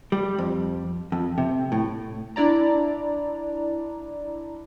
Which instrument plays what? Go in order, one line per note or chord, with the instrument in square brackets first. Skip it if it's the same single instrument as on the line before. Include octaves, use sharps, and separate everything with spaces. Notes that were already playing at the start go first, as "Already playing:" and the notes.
[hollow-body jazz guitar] G3
F2
F2
C3
A2
[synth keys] D4 E4 D5 A#5